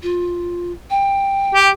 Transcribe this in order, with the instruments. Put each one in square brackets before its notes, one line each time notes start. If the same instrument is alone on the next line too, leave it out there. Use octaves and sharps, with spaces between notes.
[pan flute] F4
G5
[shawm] G4